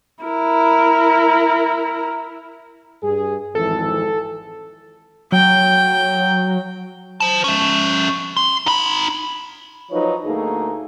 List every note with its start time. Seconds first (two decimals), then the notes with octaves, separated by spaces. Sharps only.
0.24 E4 A#4
3.03 G2 G#4
3.55 G#1 F2 E3 A4
5.32 F#3 G5
7.20 C5 A5
7.44 C#4 E5
8.37 C6
8.66 D#4 B5
9.91 F3 F#3 D#4 B4 C#5
10.25 D2 A3 A#3 D#4 G#4